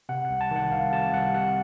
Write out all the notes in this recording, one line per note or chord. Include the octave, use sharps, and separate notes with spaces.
C3 F#5
C2 F#5
A5
D#3
F#5
C2 F5
C3 A5
C2 F#5
C3 F#5